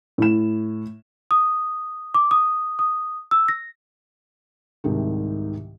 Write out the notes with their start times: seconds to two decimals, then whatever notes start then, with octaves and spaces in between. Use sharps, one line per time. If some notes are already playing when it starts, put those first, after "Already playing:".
0.18 A2 E7
1.31 D#6
2.14 D6
2.31 D#6
2.79 D#6
3.31 E6
3.48 A#6
4.84 C2 G#2 C3 D#3